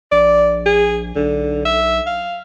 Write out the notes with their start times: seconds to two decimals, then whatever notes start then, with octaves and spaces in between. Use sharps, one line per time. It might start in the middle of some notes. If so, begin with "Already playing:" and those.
0.12 A#1 D5
0.66 G#4
1.16 B1 D3
1.65 E5
2.07 F5